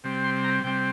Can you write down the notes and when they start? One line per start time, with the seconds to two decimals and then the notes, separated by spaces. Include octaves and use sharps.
0.04 C3 G3 C4
0.24 C6
0.44 A#5
0.64 C3 G3 C4 G5